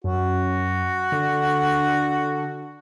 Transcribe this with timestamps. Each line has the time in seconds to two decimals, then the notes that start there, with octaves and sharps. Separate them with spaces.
0.04 F#2 F#4
1.12 D3